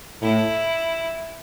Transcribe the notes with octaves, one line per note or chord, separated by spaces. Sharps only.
A2 E4